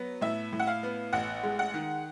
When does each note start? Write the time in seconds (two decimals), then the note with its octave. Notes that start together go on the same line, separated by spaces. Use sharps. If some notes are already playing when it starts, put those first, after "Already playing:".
Already playing: F#3 B3
0.21 A2 E5
0.53 A2
0.59 F#5
0.67 F5
0.83 B3
1.13 A1 F#5
1.43 G#3
1.59 F#5
1.74 D#3